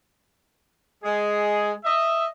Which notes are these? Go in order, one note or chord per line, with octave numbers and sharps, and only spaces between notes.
G#3 G#4
D#5 E5